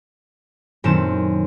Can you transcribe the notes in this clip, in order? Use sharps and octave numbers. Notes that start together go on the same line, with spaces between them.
F#2 A#2 D#3 A3 C4 E7